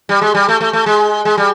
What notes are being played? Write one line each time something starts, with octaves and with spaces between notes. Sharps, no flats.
G3
G#3
G3
A3
A3
A3
G#3
G#3
G3